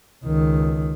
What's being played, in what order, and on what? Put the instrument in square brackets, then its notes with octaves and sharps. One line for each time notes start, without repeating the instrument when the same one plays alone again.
[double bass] C#2 D#3